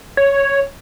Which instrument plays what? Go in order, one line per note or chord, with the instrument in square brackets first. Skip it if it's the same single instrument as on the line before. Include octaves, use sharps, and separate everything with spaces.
[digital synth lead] C#5